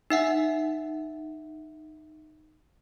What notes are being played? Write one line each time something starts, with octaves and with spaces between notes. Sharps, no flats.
D#4 E5 F#5